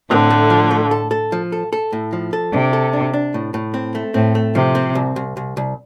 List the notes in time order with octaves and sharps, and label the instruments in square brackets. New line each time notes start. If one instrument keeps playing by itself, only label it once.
[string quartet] A2 D3 [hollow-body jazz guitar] C4
[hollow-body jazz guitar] A3
F3
A3
A4
A4
F3
A4
A4
A2
F3
A4
[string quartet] C3 [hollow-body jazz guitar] D4
[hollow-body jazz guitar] A4
D4
D4
A2
A2
C4
A3
[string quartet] A2 [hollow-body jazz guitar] C4
[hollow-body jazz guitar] A3
[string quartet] C3 [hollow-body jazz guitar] F3
[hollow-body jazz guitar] C4
C2
C2
C2
C2